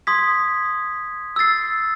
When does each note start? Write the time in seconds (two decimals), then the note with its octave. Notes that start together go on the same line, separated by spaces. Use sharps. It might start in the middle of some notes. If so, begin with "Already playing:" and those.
0.07 C6 D#6 G#6 B6
1.36 E6 A6 C7